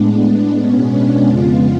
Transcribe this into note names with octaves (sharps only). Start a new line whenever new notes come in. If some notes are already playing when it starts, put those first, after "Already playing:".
Already playing: A2 G#3 B3 D4
D4
B2 G#3 B3 C#4
D4
F2 C#3 G#3 B3 F4